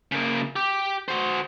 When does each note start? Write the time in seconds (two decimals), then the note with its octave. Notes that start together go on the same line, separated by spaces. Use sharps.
0.12 C#3 A#3
0.56 G4
1.08 F#4 C5